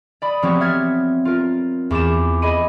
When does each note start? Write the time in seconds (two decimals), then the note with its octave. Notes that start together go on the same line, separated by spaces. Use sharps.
0.22 D5 B5 D#6
0.43 F3 B3 C4 F#4 G4 C#5
0.60 E5 F6 G#6 A6
1.25 F4 A#4
1.90 E2 D6 A6 E7
2.42 G#4 D#5 B5 D#7